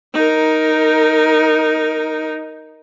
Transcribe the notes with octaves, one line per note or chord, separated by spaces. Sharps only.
D#4 A#4